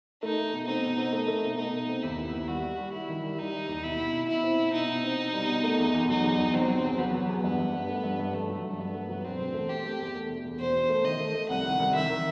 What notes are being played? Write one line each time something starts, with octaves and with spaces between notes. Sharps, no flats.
A3 D#4
A3
B2
C4 D#4
B2
C4
A3
A3
B2
A3 D#4
B2
C4
D#2 E4
B3
D#2
G3 F#4
G3
G3
G3 E4
D#3
G3
G3 D#4
G3
D#2
B2 E4
B2
B2
B2 E4
C4
B2
B2 D#4
B2
C4
B2
G3
B2
A3
E2
E2
F#3 D#4
E2
E2
F#3 C4
F#3
E2
F#3 B3
F#3
E2
G2 B3
G2
G2
A3
G2
G2
G2 A3
F#3
G2
G2 B3
A3
F#3
E1 C4
E1
A3
A3 G4
A3
E2
A3
E1
E2
E1 C5
B2
A3
D#3 D#5
A3
A3
C2 F#5
D#3
C2
D#3 E5
D#3